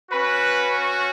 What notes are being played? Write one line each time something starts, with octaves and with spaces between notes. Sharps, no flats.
C#4 F#4 B4